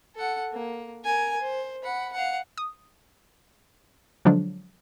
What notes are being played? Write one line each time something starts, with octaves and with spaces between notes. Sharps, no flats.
A4 F#5
A#3
A#4 G#5
C5
F#5 B5
F5 F#5
D#6
D3 F3 F#3 G#3 D4